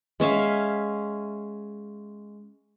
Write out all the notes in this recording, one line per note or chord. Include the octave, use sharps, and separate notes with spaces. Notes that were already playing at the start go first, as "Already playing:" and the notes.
G#3 C#4 E5 F5